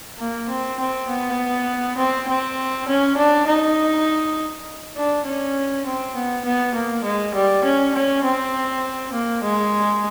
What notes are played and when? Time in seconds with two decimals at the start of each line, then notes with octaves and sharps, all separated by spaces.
0.19 A#3
0.49 C4
0.79 C4
1.08 B3
1.97 C4
2.28 C4
2.88 C#4
3.17 D4
3.47 D#4
4.96 D4
5.26 C#4
5.86 C4
6.15 B3
6.45 B3
6.75 A#3
7.04 G#3
7.34 G3
7.64 C#4
7.94 C#4
8.24 C4
9.13 A#3
9.43 G#3